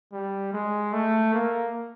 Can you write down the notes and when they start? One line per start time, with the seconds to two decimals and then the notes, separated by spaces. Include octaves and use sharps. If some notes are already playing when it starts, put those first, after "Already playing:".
0.12 G3
0.53 G#3
0.93 A3
1.34 A#3